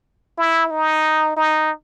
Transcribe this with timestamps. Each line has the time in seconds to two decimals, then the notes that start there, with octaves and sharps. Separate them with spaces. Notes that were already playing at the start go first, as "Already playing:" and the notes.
0.38 E4
0.71 D#4
1.37 D#4